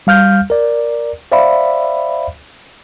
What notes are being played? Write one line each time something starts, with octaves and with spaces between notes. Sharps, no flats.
G3 F5 F6 G6
A#4 D5
C5 D5 E5 F5 B5